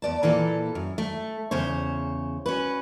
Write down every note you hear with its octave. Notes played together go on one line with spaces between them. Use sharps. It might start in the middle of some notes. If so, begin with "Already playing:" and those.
E2 D5 A5
A#2 E3 A#3 A4
F#2
A3
E2 C#3 C5 C#5
C#4 F#4 B4